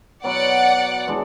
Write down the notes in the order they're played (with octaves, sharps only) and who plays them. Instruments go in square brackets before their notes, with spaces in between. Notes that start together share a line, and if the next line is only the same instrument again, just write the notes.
[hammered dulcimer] B2 F#3 B3 [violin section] D5 F#5
[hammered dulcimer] E3 G#3 D4